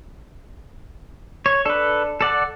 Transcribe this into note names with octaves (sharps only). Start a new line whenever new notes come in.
C#5
D4 A4 B4
A4 D5 F#5